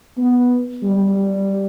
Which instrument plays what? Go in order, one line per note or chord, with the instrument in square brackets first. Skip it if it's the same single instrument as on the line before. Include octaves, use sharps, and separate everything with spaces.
[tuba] B3
G3